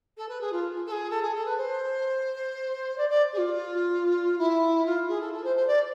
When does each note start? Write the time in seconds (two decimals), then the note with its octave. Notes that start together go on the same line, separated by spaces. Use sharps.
0.17 A4
0.29 B4
0.41 G#4
0.52 F4
0.87 A4
0.92 G#4
1.10 A4
1.23 G#4
1.35 A4
1.46 B4
1.58 C5
2.98 D5
3.10 D5
3.33 G#4
3.38 F4
4.38 E4
4.86 F4
5.09 G#4
5.21 A4
5.33 A4
5.44 C5
5.56 C5
5.67 D5